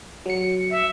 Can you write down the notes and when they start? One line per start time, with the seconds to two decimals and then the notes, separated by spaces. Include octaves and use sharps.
0.26 F#3 C#7
0.70 E5